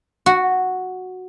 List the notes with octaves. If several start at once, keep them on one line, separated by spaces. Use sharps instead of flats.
F#4